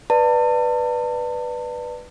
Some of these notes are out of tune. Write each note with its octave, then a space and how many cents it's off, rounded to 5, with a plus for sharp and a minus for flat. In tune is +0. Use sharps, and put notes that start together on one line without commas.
B4 +0 D5 +15 A5 +35